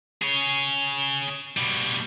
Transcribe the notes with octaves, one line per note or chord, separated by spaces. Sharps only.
G#4 C#5
B2 G3